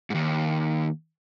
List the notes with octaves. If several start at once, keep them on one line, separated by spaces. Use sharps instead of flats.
D#2 G#2